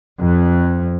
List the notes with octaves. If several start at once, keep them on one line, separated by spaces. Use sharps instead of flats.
F2